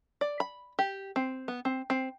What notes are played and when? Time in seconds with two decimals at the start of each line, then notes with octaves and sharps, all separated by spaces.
0.21 D5
0.40 B5
0.79 G4
1.16 C4
1.48 B3
1.65 C4
1.90 C4